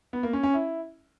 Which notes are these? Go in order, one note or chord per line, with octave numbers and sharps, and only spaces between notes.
B3
A#3
C#4
C#4
E4